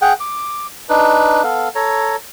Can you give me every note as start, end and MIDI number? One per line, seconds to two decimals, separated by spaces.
0.02 0.13 68
0.02 0.13 78
0.02 0.13 79
0.20 0.67 86
0.89 1.43 62
0.89 1.43 63
0.89 1.43 71
1.44 1.68 59
1.44 1.68 69
1.44 1.68 77
1.75 2.16 69
1.75 2.16 73
1.75 2.16 82